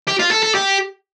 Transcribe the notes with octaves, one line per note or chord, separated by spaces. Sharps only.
G4
F4
A4
A4
G4